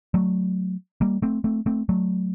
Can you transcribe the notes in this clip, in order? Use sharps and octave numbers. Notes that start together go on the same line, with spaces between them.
F#3 A3
G3 A#3
A3 C4
A3 C4
A3 C4
F#3 A3